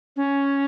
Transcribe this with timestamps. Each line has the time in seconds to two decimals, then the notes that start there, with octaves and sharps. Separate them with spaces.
0.16 C#4